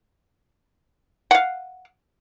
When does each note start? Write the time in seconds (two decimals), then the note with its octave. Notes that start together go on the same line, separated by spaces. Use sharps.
1.31 F5 F#5